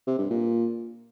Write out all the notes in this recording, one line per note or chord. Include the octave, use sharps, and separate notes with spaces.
C3
G2
A#2